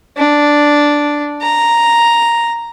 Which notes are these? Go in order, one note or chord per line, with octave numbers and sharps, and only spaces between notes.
D4
A#5